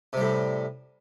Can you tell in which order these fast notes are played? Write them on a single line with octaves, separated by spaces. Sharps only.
C3 G3 A2